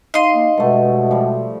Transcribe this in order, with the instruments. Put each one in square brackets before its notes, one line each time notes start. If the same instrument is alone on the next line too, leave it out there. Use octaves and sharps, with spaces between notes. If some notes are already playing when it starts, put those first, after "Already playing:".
[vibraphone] D#4 F5 [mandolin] D#5 C6
[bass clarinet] A#3
[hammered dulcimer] G2 A3 [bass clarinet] B2 [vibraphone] G#3 F#5
[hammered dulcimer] F3 G3